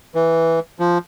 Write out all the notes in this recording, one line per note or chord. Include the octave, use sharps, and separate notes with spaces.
E3
F3